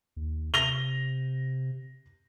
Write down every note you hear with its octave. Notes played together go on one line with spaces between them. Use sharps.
D#2
C3 A#6 F7 G7